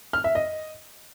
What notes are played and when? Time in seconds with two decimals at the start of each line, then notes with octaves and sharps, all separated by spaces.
0.13 F6
0.24 E5
0.35 D#5